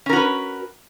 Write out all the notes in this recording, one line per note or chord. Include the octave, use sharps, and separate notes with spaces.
C#4 F#4 A#4 B4